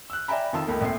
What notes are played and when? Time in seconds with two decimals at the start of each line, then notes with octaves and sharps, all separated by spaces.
0.10 E6 F#6
0.28 D5 E5 G5 G#5 A#5 B5
0.53 F2 D#3 F4 A5 E6
0.67 C#2 A3 A#3
0.81 A#1 A2 C4 C7